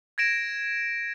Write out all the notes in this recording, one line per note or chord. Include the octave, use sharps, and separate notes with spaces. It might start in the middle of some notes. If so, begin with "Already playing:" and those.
G#6 A#6 D7 E7